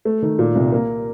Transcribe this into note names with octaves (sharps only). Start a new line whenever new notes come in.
A3
D#3
A#2
C2
A#3